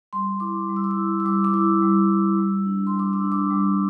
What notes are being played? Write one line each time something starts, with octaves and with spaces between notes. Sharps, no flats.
G3 C6
E4 D6
G3
E6
D6
E6
E4
E6
G3 D6
D6
E4 E6
G3
E4
G3
D4
C6
G3
D6
E6
D4
D6
G3